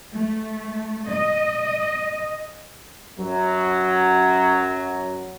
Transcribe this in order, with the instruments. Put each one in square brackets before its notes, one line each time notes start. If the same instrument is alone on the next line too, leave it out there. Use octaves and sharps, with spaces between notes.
[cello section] A3
D#5
[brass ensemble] F#2 F#3